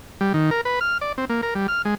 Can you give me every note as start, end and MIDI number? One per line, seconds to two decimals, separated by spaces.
0.21 0.33 55
0.34 0.50 51
0.51 0.61 70
0.65 0.79 71
0.81 0.98 89
1.01 1.13 74
1.18 1.25 60
1.29 1.41 58
1.43 1.54 70
1.55 1.67 55
1.68 1.82 89
1.85 1.95 56